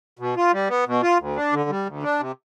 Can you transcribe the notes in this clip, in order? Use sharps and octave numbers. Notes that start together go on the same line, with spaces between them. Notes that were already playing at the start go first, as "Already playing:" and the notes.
B2
F4
G3
B3
B2
F4
D2
D4
D3
G3
D2
D4
C3